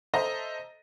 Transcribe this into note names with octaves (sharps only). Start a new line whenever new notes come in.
A4 C5 D#5 E5 A#5 A#6